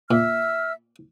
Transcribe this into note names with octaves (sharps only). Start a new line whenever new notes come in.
A#2 E5 E6 F6